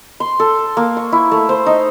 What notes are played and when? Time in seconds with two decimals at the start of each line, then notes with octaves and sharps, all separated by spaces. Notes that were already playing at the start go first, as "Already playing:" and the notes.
0.20 C6
0.40 A4
0.77 A#3
0.97 C#6
1.12 E4
1.32 A3
1.49 C5
1.66 D#4